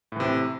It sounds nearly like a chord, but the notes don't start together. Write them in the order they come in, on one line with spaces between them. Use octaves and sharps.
A2 E3 C3